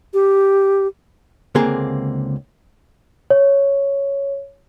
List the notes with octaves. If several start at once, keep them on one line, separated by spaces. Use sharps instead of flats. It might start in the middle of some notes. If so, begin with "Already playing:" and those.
G4
C#2 D3 A#3 C4 G#4 C6
C#5